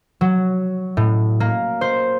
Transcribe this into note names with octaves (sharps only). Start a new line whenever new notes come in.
F#3
A2
A#3
C5